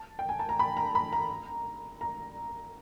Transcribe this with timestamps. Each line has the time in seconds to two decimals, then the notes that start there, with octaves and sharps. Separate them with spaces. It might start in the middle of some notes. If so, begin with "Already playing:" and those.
Already playing: A5
0.19 G5
0.29 G#5
0.39 A5
0.49 A#5
0.59 B5
0.77 A#5
0.95 B5
1.13 A#5
2.01 A#5